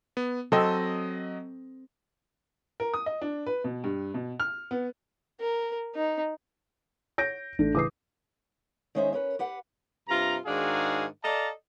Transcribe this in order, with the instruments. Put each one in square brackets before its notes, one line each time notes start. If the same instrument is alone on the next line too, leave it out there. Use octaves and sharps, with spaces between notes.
[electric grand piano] B3
[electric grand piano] F#3 D#5 [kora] C4 A4
[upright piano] A#4
D#6
D#5
D4
B4
B2
G2
B2
F6
B3
[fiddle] A#4
D#4
[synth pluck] C#5 [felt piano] G6 A#6 D7
[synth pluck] A1 [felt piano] A3 D4
[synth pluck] A2 C#3 E3 [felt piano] D6 D#6 C7
[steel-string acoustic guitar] D#3 G#3 C#4 D#4 C5 E5
C#4 A#4 B4 C#5
G4 B4 F#5
[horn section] G2 C3 F4 A#5
G#2 D#3 D4 F#4 G#4 F5
A4 D5 D#5 F5 A5 A#5